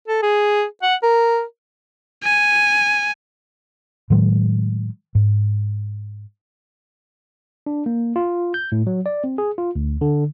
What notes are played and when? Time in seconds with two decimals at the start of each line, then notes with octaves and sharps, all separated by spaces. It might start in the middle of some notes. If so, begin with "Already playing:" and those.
0.07 A4
0.22 G#4
0.82 F#5
1.02 A#4
2.23 G#5
4.10 A2 D#3 F#3 G#3
5.15 G#2
7.66 D4
7.86 A#3
8.16 F4
8.54 G6
8.72 A2
8.87 F#3
9.06 D5
9.24 C4
9.38 G#4
9.58 F4
9.76 D2
10.01 D3